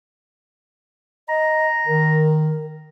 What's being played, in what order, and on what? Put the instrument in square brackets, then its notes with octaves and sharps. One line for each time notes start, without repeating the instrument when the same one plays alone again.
[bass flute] D#5 [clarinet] A#5
[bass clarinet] D#3 [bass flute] A#4